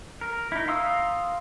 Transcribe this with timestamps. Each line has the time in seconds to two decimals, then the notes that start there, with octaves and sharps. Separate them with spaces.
0.21 A#4
0.52 D#4 E4
0.68 F5 A#5 C6 D#6 E6